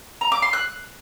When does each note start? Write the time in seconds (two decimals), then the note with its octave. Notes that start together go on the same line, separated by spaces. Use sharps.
0.21 A#5
0.32 D6
0.42 C6
0.53 F#6